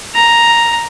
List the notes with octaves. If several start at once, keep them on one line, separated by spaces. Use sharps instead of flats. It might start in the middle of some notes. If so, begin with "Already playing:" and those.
A#5